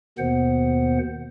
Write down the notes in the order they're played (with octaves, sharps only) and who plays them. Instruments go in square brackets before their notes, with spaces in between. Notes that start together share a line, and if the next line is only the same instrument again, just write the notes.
[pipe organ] D#2 B2 D#3 B3 C5 F#5